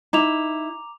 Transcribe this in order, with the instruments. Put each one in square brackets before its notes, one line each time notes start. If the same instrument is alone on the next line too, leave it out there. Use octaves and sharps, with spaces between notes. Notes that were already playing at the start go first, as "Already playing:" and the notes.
[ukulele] D#4 E4 [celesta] A#5 D6 F7